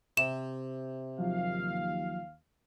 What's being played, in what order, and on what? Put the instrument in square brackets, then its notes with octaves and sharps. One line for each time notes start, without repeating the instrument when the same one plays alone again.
[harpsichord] C3 [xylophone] E7
[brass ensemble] D#2 F5 [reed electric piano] F3 F#3 F4